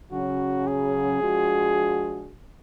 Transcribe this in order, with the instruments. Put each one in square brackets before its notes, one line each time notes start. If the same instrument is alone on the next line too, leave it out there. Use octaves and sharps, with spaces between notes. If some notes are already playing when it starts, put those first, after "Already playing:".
[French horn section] C#3 F#3 C#4 [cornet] F#4
[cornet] G#4
[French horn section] F3 G#3 D4 F#4